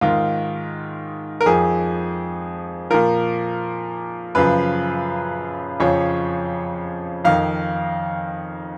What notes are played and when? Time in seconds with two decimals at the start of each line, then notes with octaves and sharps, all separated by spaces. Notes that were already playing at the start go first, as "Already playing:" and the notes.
0.01 G#2 D#3 F4
1.41 A#4
1.46 F2 F3 G#4
2.90 A#2 F3 A#4
4.35 F#2 C#3 F3 B4
5.80 F2 C#3 F3 C#5
7.25 F2 D#3 F5